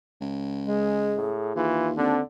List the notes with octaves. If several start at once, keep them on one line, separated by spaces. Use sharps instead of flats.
C#2
G#3 G#4
A2
D#2 E3 F4
D3 C4 D4